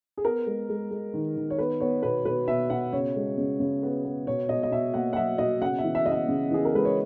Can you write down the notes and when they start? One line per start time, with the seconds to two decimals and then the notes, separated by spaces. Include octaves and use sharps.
0.18 G#4
0.24 B3 A#4
0.46 G#3
0.69 G#3
0.91 G#3
1.14 D#3
1.36 D#3
1.50 C#5
1.58 B3 B4
1.80 B3 C#5
2.03 B2 B4
2.25 B2 B4
2.48 B2 E5
2.70 B2 F#5
2.93 C#3 C#5
3.16 G#3
3.38 C#3
3.60 C#3
3.83 B3
4.05 B3
4.27 B2 C#5
4.49 B2 D#5
4.63 D#5
4.72 B2 E5
4.94 A#3 F#5
5.13 F#5
5.16 F#3 E5
5.38 B2 D#5
5.61 C#3 F#5
5.78 E5
5.84 E3
5.95 E5
6.06 C#3 D#5
6.12 E5
6.28 C#3
6.51 E3 G#4
6.65 A#4
6.74 G#3 B4
6.85 C#5